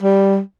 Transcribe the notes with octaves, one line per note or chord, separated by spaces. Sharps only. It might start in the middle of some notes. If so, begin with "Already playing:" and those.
G3